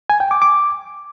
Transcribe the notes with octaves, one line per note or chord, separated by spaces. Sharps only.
G#5
G5
D6
D6